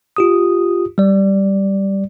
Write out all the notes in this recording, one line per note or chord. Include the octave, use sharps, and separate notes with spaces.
F4 G4 D#6
G3 D5